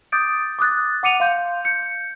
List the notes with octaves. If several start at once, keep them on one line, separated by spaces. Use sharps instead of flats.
D6 D#6 G6 A6 D7
D6 D#6 F#6 A6
F#5 D6 C#7 D#7 F7
F5 C6 G6
G6 C#7